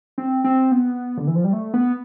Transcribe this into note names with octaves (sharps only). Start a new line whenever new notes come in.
C4
C4
B3
D3
E3
F3
G3
A3
B3